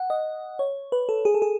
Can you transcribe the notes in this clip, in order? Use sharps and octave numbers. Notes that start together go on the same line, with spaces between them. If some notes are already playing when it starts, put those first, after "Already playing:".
Already playing: F#5
D#5
C#5
B4
A4
G#4
A4
G#4